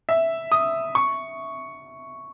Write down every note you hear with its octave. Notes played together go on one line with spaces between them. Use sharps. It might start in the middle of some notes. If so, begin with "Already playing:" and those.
E5
D#6
C#6